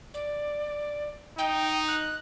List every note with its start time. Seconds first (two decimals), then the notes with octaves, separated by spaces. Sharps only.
0.14 D5
1.38 D#4 G5
1.88 F#6